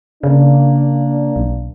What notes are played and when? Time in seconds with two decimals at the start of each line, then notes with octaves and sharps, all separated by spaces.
0.23 C#3 A#3 D4
1.36 B1